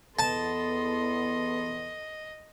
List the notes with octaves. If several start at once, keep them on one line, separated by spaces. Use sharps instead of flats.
E2 B3 A4 D#5 A5 C6